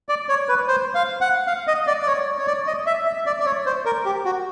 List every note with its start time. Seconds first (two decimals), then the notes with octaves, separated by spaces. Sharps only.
0.09 D5
0.29 C#5
0.49 B4
0.68 C5
0.95 F5
1.21 F#5
1.47 F5
1.67 D#5
1.87 D5
2.03 D5
2.07 C#5
2.39 C#5
2.47 D5
2.67 D#5
2.86 E5
3.06 E5
3.26 D5
3.40 D5
3.46 C#5
3.66 C5
3.85 A#4
4.05 G4
4.25 F#4